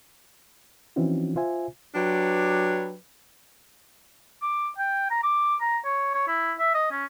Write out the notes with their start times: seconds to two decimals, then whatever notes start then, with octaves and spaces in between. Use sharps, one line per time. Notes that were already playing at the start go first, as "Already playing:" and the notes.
0.96 E3 F3 C4 C#4 D#4 F#4
1.36 F4 C5 E5 G#5
1.95 F#3 D4 G4 B4
4.42 D6
4.78 G5
5.11 A#5
5.23 D6
5.61 A#5
5.85 C#5
6.14 C#5
6.28 E4
6.59 E5
6.74 D#5
6.92 C#4